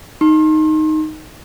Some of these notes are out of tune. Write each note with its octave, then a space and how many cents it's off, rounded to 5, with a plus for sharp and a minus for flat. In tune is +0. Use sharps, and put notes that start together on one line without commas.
D#4 +0 C6 +40